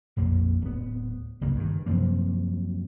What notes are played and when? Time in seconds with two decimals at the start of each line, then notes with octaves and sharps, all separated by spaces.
0.17 A#1 F2 A#3
0.61 D1 B3
1.41 F#1 C2 C#3 A#3
1.56 G2 D#3
1.86 F#2 C3 F3 A#3